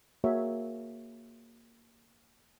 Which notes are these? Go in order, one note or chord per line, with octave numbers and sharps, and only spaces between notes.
A#3 F#4 G#4 A#4 C#5 E5